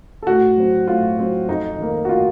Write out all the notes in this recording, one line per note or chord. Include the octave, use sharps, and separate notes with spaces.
A4
A2 F#4
F#3 C4
A2 F4
F#3 C4
F2 D#4
D#3 A#3
F#4
F4